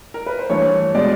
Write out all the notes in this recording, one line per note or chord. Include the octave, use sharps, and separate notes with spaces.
A#4
B4
C5
G2 E3 A3 C#5
B2 G#3 D5